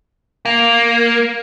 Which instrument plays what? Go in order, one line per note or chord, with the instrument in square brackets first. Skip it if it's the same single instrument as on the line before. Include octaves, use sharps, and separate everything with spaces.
[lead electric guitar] A#3